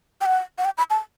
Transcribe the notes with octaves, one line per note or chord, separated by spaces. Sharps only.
G5
F#5
F#5
G5
B5
A5